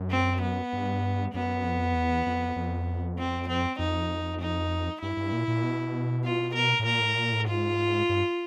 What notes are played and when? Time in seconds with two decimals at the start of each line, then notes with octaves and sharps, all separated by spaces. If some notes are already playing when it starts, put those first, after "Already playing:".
Already playing: F#2
0.11 C4
0.41 B3
0.73 G2
1.34 F#2 B3
1.65 F2
1.95 E2
2.26 F2
2.56 F2
3.18 C4
3.48 C4
3.79 F2 D#4
4.41 D#4
5.01 G2 E4
5.17 G2
5.32 A#2
5.48 A#2
5.63 B2
6.24 F4
6.55 A#4
6.79 A2
6.85 A#2 A#4
7.01 A2
7.16 A#2
7.32 A2
7.47 G#2 F4
8.09 G2